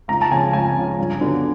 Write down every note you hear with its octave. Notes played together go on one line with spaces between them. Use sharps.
C#2 A#5
A5
C#3 F3 G#5
C#2 G#5
C#3 F3
G2
D3 F#3 B3